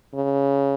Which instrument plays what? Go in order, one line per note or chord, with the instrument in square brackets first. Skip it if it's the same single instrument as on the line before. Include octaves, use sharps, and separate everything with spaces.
[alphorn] C#3